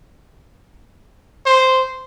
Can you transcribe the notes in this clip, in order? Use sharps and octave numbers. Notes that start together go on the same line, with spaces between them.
C5